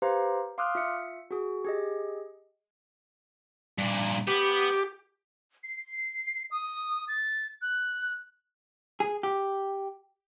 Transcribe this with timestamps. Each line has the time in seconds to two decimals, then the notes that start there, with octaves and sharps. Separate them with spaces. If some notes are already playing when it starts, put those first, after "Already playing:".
0.02 G4 B4 C5 F5 A#5 C6
0.58 F5 C6 D6 D#6 F6 F#6
0.75 F4 E5 C#7
1.31 F#4 G#4
1.65 G4 G#4 D#5
3.78 G2 A#2
4.27 B3 G4
5.64 C7
6.51 D#6
7.08 A6
7.62 F#6
9.00 G#4
9.23 G4